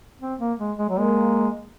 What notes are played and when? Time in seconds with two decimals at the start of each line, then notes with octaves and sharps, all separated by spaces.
0.21 C4
0.40 A#3
0.59 G#3
0.78 G#3
0.89 F#3
0.97 G#3 A#3